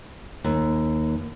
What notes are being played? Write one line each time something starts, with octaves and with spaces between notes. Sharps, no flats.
D#2